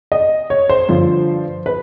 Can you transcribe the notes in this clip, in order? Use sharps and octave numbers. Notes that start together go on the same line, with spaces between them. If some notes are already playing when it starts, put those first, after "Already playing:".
D#5
C#5
C5
G2 D3 F3 C5
B4